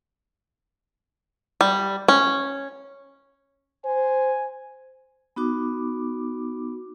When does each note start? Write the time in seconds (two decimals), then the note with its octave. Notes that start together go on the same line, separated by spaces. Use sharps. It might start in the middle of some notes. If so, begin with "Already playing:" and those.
1.61 G3
2.08 C#4
3.85 C5 G#5
5.36 B3 D#4 F#4 D6